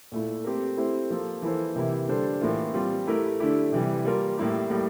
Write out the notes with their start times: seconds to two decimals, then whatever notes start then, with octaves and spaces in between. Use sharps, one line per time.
0.12 A#2 A3 E4
0.44 A3 C4 G4 A#4
0.77 A3 C4 E4 G4 C5
1.10 F3 A#3 F4 A4
1.42 E3 A#3 E4 A4 C5
1.75 C3 E3 A#3 E4 G4
2.08 D3 G3 D4 A4 C5
2.41 A2 E3 A#3 F4
2.74 G3 C4 F4
3.07 A3 E4 G4 A#4
3.40 D3 A3 E4 G4
3.72 C3 E3 G3
4.05 G3 A#3 F4 A#4
4.38 A2 G3 A#3 E4 G4
4.70 A2 G3 A#3